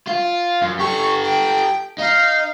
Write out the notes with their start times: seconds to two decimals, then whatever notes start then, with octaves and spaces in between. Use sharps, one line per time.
0.08 F4
0.62 F#2
0.79 G4 A4 C#6
1.22 G5
1.99 D#4 F5